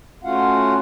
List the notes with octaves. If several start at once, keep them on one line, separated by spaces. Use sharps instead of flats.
A3 C#4 F4 F#4 F5 F#5